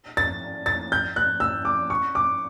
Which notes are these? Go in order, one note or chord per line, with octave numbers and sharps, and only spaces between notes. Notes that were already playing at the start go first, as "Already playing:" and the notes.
A6
A6
G6
F#6
E6
D6
C#6
D6